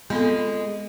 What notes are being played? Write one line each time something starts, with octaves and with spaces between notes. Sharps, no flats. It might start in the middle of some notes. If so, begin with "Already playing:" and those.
G#3 B3 C4 F4 A4